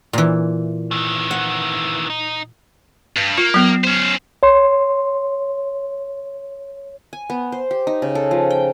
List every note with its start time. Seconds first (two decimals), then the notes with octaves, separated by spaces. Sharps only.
0.13 A#2 E3
0.91 D#3 E3
1.31 F#5
2.10 D#4
3.17 G2
3.38 A#3 F4
3.54 F#3 B3
3.84 C#4 C5
4.43 C#5 C6
7.13 G#5
7.30 B3
7.52 C5
7.71 G4
7.87 D#4
8.02 C#3
8.15 A4
8.31 F3
8.50 G5